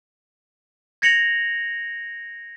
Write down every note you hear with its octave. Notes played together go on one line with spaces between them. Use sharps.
G#6 A#6 C#7 F7 F#7